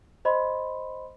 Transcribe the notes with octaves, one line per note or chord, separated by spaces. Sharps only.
C5 D#5 B5 C6